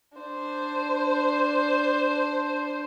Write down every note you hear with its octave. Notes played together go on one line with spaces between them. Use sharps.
D4 C5